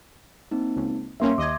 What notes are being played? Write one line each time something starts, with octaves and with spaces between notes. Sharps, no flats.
A#3 C4 D#4
C#2
G2 A#3 C#4 E5 C6
D#2 D#5 D6 G#6